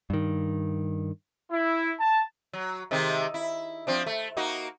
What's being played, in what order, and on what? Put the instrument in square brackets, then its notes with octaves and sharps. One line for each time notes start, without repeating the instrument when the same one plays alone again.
[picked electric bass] G2 D#3
[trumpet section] E4
A5
[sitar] F#3
C3 D#3 G#3
E4
F3 C4 D4
A3
A#3 D#4 F#4